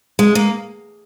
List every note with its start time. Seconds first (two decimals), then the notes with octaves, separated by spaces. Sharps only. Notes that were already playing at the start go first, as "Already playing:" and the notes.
0.19 G#3
0.35 A#3